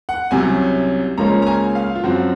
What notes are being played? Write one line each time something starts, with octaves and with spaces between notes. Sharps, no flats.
F#5
C2 C3 F#3 C#4 G#5
C#2 C#3 F3 A#3 C#4 A#5
A#5
G#5
F5
F4
F#2 F3 C4 F#4